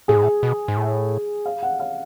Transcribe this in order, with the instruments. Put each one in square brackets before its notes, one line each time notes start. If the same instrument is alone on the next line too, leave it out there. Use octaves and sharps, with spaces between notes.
[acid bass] A2 [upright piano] G#4
[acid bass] G#2
A2
B2
G#2
A2
[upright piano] F5
F#5
F5